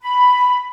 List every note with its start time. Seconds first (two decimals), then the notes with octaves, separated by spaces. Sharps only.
0.01 B5